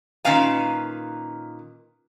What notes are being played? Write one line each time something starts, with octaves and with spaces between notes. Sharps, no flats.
A#2 D#3 C#4 B4 F5 G#5